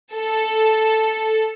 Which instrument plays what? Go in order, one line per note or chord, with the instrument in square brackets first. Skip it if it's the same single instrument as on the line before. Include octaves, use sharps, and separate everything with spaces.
[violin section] A4